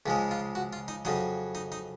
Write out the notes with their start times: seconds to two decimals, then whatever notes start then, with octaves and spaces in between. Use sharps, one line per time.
0.06 C#2 C#3 F3 G#3
0.31 F4
0.55 F#4
0.73 F4
0.88 D#4
1.05 F2 C#3 F#3 D#4
1.55 D#4
1.72 D#4